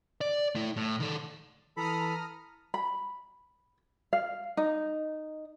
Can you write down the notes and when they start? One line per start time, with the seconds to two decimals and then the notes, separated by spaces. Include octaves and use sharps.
0.21 D5
0.55 A3 E4
0.77 A2
1.00 D#3 A4
1.77 E3 A4 A#5 B5 D#6 F6
2.74 B5
4.13 F5
4.57 D#4